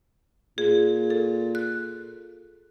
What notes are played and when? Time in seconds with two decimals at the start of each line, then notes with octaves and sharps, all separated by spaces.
0.58 A#2 G#4
1.10 A4
1.55 F#6